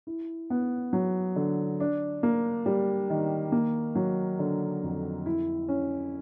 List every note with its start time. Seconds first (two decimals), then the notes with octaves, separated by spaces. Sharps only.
0.07 E4
0.50 B3
0.93 F#3
1.36 D3
1.80 D4
2.23 A#3
2.66 G3
3.10 D#3
3.52 A#3
3.95 F#3
4.39 D3
4.83 F2
5.26 E4
5.69 C#4